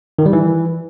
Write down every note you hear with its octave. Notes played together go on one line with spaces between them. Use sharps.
D#3
G3
E3